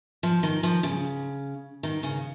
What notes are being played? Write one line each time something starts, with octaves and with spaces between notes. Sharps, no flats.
F3
D#3
F3
C#3
D#3
C#3